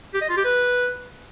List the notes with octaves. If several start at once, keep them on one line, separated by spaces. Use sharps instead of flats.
G4
D#5
F4
G4
B4